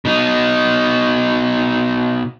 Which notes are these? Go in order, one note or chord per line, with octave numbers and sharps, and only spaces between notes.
B2 D#4